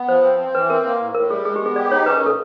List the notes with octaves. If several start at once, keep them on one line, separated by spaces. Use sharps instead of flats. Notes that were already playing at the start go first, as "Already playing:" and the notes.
Already playing: B3
F3 C5
C4
C4
E3 B4
C4 A#4
A#3
A2
A2 A#4
G3 G#4
G#3 G#4
G4
B3 G#4
G4 D5
D#4 C#5
C#4 B4
A#4
A#2 A4